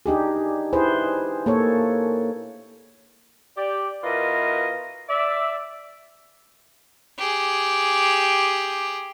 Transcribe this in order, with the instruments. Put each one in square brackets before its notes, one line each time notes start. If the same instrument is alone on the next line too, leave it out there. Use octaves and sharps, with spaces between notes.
[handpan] D4 D#4 G4 G#4
E4 G#4 B4 C5
A#3 A4 C#5
[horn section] G4 D5
B2 E4 F4 A#4 B4 D#5
D5 E5
[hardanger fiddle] G4 G#4